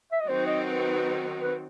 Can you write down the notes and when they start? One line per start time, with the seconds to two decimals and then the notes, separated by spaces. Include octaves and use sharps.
0.12 E5
0.20 D#5
0.27 D#3 F#3 C4 D#4 F#4 C5
0.46 D#5
0.66 B4
1.42 B4